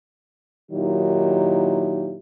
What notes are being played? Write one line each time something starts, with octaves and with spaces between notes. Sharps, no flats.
A#2 D#3 F#3 D#4 E4 G4